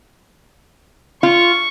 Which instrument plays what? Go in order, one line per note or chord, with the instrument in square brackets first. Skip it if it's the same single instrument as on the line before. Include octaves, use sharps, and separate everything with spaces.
[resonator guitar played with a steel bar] F4 [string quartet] C#6